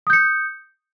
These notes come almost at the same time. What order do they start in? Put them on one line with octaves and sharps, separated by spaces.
D#6 G6 C#7